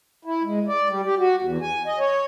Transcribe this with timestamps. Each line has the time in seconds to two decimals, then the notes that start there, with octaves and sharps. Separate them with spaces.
0.25 E4
0.44 G#3
0.68 D5
0.89 G3
1.04 G4
1.18 F#4
1.42 E2
1.61 G#5
1.86 D#5
1.99 C#5